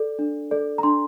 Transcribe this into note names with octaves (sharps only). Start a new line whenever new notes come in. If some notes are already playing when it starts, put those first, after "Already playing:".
Already playing: A4 D5
D4
A4 D5
A#5
D4 C6